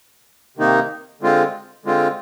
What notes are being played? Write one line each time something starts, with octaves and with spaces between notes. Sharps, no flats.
C3 D#3 A#3 D#4
D3 G#3 C4 F4
D3 G#3 C4 F4